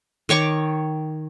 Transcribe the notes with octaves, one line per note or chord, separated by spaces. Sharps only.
D#3 C#5 C#6 D6